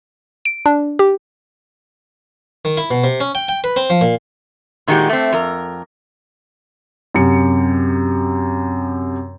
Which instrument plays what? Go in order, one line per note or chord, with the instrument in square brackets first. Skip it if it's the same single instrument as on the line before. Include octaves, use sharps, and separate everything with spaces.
[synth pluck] D7
D4
G4
[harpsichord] D#3
E4
B2
C3
C#4
G5
G5
B4
C4
F3
A#2
[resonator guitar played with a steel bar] A#2 D#3 G#3 F#4 G4
A3 C4
F2 A#4
[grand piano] F#2 C3 C#7